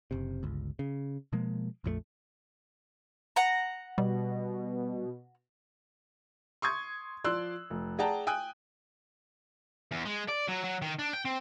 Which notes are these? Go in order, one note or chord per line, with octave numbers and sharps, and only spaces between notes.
F#1 C3
G1 C#2
C#3
B2 F3 G#3 A#3
A#1 F2 E3 A3
F#5 A#5
B2 G3
C6 C#6 D#6 G#6
F3 D5 C6 E6 F#6
F1
G#4 D5 F#5 G5 A5 A#5
G5 G#5 D#6 F#6
E2
G#3
D5
F#3
F#3
D#3
D4
G5
C4